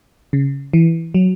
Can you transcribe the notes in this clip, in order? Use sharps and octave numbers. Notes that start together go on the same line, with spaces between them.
C#3
E3
F#3